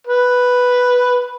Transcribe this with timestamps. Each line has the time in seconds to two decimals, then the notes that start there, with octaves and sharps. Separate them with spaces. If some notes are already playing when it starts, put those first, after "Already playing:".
0.07 B4